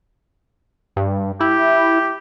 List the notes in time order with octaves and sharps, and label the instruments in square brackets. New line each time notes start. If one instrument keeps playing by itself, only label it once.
[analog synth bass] G2
[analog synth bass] E4 [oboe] G4